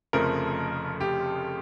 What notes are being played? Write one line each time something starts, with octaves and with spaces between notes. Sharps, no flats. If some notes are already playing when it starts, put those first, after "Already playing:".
F1 F2 C#3 F3 A3 A#4
G4